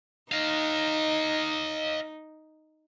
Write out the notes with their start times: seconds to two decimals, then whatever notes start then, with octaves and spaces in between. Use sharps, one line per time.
0.32 D#4 D#5 F5